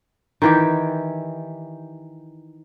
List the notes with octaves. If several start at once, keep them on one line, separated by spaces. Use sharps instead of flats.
D#3 E3 G4